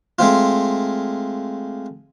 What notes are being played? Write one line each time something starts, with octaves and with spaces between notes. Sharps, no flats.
G#3 A3 C4 F4